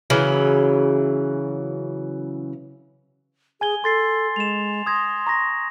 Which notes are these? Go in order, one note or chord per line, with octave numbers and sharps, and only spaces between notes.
C#3 E3 F#3
G#4 G#5 G#6 G7
A4 C6 A6 C7
G#3 E7 F7
C6 D#6 G#6 A#6
A#5 C#6 A#6